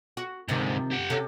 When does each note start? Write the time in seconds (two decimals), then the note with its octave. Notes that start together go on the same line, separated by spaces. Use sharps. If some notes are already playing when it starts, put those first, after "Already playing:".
0.17 F#4
0.49 D2 G#2 C3 D#3 F3
0.92 G4 F#5
1.10 C3 C#4 A4